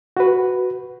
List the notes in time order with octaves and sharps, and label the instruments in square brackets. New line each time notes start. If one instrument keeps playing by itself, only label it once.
[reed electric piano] F#4 B4